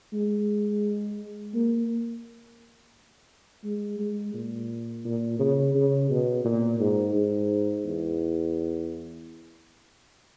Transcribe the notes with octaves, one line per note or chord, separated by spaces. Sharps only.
G#3
A#3
G#3
G#3
A#2
A#2
C#3
C#3
B2
A#2
G#2
G#2
E2